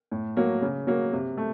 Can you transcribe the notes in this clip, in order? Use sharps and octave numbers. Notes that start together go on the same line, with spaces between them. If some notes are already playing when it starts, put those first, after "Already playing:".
A2
F#3 A#3
C#3
F#3 A#3
C3
A3